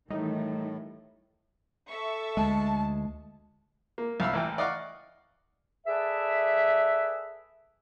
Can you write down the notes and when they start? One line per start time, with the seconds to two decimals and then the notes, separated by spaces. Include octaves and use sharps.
0.10 A2 D#3 E3 G3 A3 D#4
1.88 A4 E5 C#6
2.37 D2 G#3 A5
3.98 A#3
4.20 C2 F5 B5 E6
4.33 A1 E3 G5
4.58 D5 D#5 F5 F#5 C#6 D6
5.87 G#4 A4 B4 D5 E5